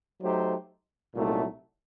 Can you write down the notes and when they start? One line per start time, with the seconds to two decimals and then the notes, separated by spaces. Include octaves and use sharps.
0.22 F#3 A3 D#4 G4 C5
1.14 C2 A#2 F#3 A3 D#4